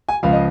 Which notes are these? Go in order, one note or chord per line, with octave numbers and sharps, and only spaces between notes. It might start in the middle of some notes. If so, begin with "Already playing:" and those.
G#5
C#2 C#3 F3 F5
D#5